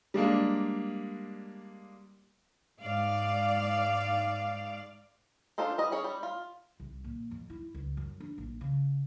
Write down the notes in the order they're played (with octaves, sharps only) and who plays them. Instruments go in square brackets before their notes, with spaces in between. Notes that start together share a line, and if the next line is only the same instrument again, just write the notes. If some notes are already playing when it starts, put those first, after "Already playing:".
[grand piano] G3 G#3 A#3 D4
[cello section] G#2 D5 F5
[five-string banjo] D4 D#4 F4 A4 C5
G3 D#5
C#4 G#4 C#5
G3
F4
[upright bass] C2
A#2
F2
E4
C#2
F#2
D4
A#1
C#3